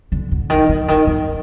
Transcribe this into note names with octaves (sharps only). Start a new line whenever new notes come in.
D3
D3
D#3
D3
D#3
D#3